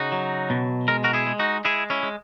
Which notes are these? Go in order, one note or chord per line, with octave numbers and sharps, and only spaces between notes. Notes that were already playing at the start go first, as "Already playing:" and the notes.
Already playing: C#3 D#4 F#4
F#3
B2
G#3 A#4
F#4 A#4
E4 G#4
G#3
D#4 F#4
G#3 E4 G#4
C#4 E4
G#3